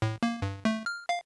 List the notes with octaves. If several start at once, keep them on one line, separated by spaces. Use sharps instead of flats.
A2
A#3
G2
A3
F6
F5